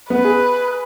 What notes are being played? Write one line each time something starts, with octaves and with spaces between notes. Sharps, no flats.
B3 B4
G#4